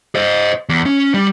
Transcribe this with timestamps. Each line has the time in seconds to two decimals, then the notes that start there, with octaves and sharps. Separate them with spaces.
0.15 C5 D#5
0.69 E2
0.86 C#4
1.14 G3